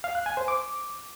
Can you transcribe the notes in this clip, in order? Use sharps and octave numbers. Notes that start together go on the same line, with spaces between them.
F5
F#6
G#5
C5
D6